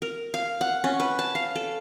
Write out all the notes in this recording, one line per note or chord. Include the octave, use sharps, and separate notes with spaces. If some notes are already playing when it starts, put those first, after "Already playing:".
A#4
F5
F#5
C#4
B4
A5
F5
A4